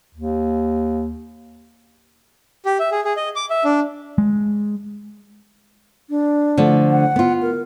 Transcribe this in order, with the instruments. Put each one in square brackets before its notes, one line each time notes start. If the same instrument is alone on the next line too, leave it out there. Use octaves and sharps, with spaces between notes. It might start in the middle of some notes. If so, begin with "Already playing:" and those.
[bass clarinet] D#2
[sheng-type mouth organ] G4
E5
G#4
G#4
D#5
D6
E5
D4
[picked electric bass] G#3
[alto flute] D4
[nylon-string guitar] D3 F3 A3
[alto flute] F#5
[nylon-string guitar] B3 F4
[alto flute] A#4